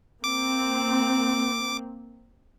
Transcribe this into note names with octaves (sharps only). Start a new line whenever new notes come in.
A#3 C4 D6